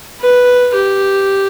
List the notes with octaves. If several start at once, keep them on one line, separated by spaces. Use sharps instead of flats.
B4
G4